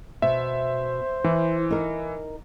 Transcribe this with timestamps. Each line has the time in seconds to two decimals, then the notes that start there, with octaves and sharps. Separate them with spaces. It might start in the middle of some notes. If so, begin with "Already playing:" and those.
0.22 B2 C5 E5
1.24 E3 E4
1.70 D#4 A#4